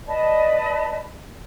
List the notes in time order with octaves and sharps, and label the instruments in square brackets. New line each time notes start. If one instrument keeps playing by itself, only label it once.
[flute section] B4 D5 D#5 A5